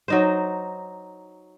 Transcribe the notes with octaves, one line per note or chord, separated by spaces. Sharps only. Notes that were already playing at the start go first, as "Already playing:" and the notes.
F#3 D#4 C5